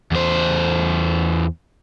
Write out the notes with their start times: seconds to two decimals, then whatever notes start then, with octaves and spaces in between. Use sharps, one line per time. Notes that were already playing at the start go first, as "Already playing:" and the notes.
0.11 E2 C5